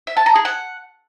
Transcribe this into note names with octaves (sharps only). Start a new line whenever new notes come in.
E5
A5
A#5
G#4
F#5